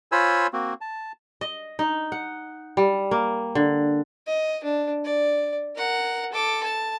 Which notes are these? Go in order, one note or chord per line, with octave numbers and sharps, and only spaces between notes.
F4 C5 C#5 G#5 B5 E6
A#3 C4 F#4
A5
D#5
D#4
F#5
G3
A#3
D3
D#5
D4
D5
A#4 F#5
A4 D6
A5